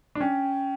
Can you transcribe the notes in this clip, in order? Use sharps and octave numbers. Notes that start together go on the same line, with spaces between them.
D4
C#4 G5